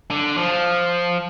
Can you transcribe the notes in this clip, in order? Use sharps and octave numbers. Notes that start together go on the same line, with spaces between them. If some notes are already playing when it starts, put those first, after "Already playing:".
D3
F3